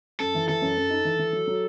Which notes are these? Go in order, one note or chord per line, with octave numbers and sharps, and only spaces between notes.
F#2 A4
E3
E3 A4
F#2
F#2
D#4
E3
E3
F#3
F#3